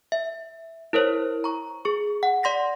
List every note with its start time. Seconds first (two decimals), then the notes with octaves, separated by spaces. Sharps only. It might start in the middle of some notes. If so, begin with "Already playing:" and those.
0.12 E5
0.93 E4 A#4 C5 C#5
1.44 A#5 C#6
1.85 G#4 C#6
2.23 F#5
2.43 D5 C6 A#6 B6